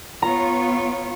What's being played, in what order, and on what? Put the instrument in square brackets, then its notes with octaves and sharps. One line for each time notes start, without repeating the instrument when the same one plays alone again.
[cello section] B3 F4 C#5 [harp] A#5